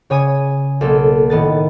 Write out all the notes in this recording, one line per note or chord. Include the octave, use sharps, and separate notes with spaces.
C#3 C#5 G#5 D#6
B1 A#3 A4
A2 D#3 B3 A6